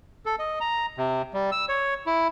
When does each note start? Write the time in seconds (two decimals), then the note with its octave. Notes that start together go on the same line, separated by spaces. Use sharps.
0.26 A4
0.39 D#5
0.60 A#5
0.98 C3
1.34 G3
1.52 E6
1.69 C#5
2.06 E4